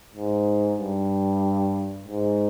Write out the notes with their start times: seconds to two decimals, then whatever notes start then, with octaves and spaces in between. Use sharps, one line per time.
0.13 G#2
0.77 G2
2.05 G#2